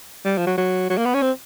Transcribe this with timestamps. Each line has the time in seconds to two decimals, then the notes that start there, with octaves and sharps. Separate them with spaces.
0.25 G3
0.38 F3
0.47 F#3
0.58 F#3
0.90 F#3
0.98 A#3
1.06 B3
1.14 C#4
1.22 C4